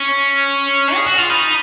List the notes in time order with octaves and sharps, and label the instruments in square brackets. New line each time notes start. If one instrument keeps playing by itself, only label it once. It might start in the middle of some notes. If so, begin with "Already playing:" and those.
Already playing: [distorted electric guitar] C#4 [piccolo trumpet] C#6
[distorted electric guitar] G#4
F#4
F4
[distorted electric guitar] D#4 [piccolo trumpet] B5